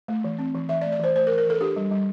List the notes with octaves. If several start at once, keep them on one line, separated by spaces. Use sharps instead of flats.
A3
E3
C4
E3
E3 E5
D5
A3
D5
E3 C5
A3 C5
A#4
E3
A#4
E3 A4
D4 G4
G3
G3